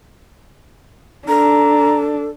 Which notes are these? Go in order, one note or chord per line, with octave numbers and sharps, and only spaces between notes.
D4 A4 A#5